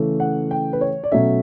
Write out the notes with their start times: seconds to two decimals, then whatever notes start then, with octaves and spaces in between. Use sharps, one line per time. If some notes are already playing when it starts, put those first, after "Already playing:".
Already playing: C#3 E3 A3 C#4
0.20 F#5
0.51 G5
0.73 B4
0.81 C#5
1.04 D5
1.11 B2 F#3 A3 C#4 E5